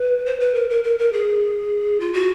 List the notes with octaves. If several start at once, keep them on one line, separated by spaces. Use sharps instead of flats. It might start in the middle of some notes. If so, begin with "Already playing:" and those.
Already playing: B4
C5
B4
A#4
A#4
A#4
A#4
G#4
F4
F#4